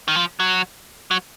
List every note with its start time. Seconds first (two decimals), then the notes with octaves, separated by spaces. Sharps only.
0.08 D#3
0.16 F3
0.40 F#3
1.11 F#3